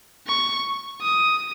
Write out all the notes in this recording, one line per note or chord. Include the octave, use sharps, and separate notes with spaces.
C#6
D#6